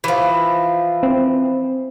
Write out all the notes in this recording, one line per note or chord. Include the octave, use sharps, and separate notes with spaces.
E3 F3
C4